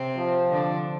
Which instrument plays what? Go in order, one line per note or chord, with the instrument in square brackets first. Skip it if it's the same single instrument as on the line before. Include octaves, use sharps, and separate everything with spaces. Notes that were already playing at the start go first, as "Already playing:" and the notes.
Already playing: [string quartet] C3 C4
[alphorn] F3
[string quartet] D3 D4